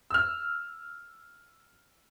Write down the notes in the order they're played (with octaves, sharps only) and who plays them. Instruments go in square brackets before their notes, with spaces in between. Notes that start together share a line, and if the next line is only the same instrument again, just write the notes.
[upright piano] E6 F6